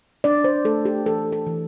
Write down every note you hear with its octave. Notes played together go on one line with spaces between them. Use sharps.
D4 D5
C5
A3 A4
G4
E3 A4
A4
E3